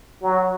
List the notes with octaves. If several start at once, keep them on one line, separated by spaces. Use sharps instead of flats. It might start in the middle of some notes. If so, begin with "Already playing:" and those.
F#3